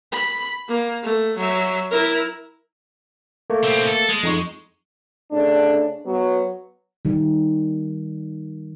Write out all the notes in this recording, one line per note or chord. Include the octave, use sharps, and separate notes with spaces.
B5
A#3
A3
F#3 E5
E4 A#4
A3 A#3
B2 C4
A4
G#3
F2 D#4 C#6
C#3 A3 D4
F#3 B3
D#3 G3